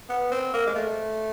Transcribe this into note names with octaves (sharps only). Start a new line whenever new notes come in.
B3
C4
A#3
G#3
A3